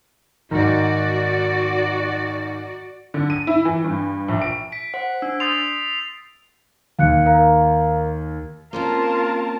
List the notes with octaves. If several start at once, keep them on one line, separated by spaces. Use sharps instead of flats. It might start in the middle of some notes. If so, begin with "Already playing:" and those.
G#2 D#3 F#4 D5
D3
D#7
E4
E3
G2
A#1
D7
B6 D7
C5 F#5
D4 E6
C6 D#6 G6 A6 C7 F7
D#2 F5 F#6 C#7
A#4 F5 A#5
A#3 C4 C#4 F4 A#4 A5